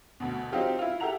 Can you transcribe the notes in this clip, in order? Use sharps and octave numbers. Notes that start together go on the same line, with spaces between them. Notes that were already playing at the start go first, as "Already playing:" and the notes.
D2 B2
F#3 C4 D#4 F4 G4
E4 F4
G4 A4 E5 F#5 A#5 F7